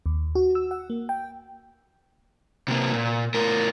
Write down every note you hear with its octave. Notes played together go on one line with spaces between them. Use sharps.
D#2
F#4
E6
F#5
A#3
G5
C3 A#3
A#2
A2 A#4